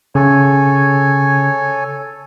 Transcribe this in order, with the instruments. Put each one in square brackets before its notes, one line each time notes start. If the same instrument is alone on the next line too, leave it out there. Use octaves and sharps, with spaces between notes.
[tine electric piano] C#3 [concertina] A4 C#5 G#5